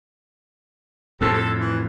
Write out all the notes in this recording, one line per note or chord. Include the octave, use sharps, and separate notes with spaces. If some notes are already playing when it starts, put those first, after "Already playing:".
F2 A2 C3 A3 A4
A4
E3